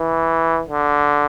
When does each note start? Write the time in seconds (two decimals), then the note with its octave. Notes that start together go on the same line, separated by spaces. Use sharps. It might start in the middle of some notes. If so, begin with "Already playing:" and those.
Already playing: E3
0.69 D3